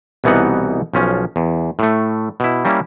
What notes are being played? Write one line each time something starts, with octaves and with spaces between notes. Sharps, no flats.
C2 B2 E3 B3 D#4 F#5
B1 F3 C#4
E2
A2 A3
B2 E4
G3 A#3 C#4 E4